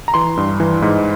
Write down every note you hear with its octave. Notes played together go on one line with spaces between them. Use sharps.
A#5
E3 C6
G2
E3
G#2